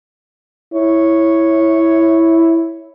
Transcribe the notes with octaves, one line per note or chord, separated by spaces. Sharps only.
E4 C#5